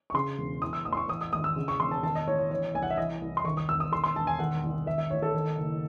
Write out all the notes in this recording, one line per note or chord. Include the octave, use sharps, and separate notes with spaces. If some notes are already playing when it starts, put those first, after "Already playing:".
C#6
C#3 C6
E1
E3 D#6
E6
A1 D#6
C6
C#6
E3 D#6
D#6
G#1 D#6
E6
C#3
C#6
E1 C6
A5
D#3 A5
D#5
A1 C#5
C#5
E3 C#5
C2 G#5
F#5
E5
E3 D#5
C2
C6
D#3 C#6
D#6
E1 E6
D#6
D#3 C6
C6
E1 A5
G#5
D#3 F#5
C2
D#3 E5
E5
A1 C#5
A4
D#3
F#1